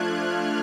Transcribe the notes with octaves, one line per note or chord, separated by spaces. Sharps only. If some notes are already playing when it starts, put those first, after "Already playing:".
Already playing: F3 A3 D4 F4 F6 F#6 G#6